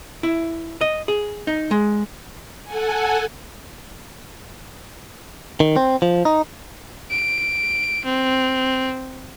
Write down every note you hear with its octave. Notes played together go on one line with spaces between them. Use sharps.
E4
D#5
G#4
D#4
G#3
A4 F#5 G#5
D#3
C4
F3
D#4
D7
C4